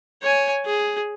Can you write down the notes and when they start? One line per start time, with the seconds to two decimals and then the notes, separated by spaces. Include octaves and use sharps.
0.22 C#5 G#5
0.65 G#4